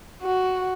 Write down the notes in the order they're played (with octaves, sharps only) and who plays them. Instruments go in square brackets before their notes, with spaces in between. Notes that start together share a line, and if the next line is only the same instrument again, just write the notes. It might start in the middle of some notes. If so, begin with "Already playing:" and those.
[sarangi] F#4